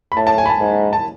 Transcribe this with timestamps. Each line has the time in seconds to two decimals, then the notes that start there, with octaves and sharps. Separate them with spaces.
0.12 B5
0.16 A2 A5
0.27 A5
0.38 G#5
0.46 B5
0.49 A5
0.60 G#2 G#5
0.93 A5